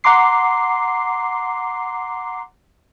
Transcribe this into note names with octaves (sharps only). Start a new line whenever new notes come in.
F#5 A#5 C6 D6 C7